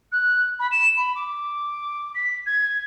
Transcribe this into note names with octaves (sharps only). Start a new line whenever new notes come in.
F#6
B5
E7
B5
D6
B6
G#6